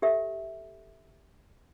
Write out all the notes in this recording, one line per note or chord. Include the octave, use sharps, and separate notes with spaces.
G4 A4 E5